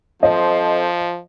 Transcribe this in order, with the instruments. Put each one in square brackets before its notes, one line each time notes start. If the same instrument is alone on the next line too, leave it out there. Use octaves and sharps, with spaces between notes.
[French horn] F3 [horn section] C4 A4 C5 [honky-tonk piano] D#5